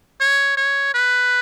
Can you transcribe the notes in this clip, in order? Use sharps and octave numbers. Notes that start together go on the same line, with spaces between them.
C#5
C#5
B4